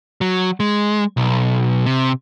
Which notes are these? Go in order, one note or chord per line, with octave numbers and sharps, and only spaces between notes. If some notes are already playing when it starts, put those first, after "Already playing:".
F#3
G#3
B1
C3